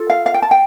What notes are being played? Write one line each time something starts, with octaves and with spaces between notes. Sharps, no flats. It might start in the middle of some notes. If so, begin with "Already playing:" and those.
Already playing: F4 A4
F5
F5
G5
A5
G5